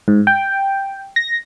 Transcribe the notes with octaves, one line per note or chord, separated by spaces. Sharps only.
G#2
G5
A#6